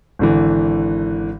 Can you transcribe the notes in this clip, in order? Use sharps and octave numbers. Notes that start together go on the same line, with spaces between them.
G#1 D3 E3